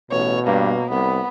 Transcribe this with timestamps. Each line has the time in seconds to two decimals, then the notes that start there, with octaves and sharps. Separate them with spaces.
0.11 A1 B2 C#5
0.47 G2 A#3
0.90 C2 B3